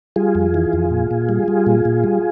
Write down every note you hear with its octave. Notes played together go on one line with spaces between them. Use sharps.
G3 F4 G#4
F2
E3
F2
A#2
A#2
G3
G3
A#2
A#2
G3